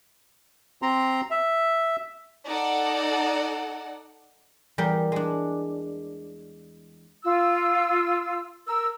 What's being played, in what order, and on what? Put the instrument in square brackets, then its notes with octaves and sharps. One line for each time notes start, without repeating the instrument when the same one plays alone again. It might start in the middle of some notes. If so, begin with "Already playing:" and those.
[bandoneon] C4 A#5 C6
E5
[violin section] D#4 A4 D5 F#5
[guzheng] E2 G3 A#4 G5
G#3 D4
[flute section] F4 E6
A#4 E6